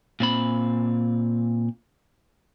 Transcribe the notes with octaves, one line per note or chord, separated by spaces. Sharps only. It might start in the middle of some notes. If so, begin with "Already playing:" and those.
A#2 C4 B5